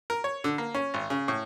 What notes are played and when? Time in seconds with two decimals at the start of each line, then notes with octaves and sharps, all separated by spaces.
0.10 A#4
0.24 C#5
0.44 D3
0.58 A#3
0.75 C#4
0.94 G#1
1.10 C#3
1.28 A2